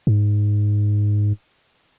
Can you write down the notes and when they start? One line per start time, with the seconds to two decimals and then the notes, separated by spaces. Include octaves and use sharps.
0.07 G#2